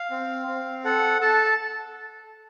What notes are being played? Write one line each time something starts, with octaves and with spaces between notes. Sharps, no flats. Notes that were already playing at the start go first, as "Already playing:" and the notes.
Already playing: F5
C4
C4
A4 F#5
A4 A5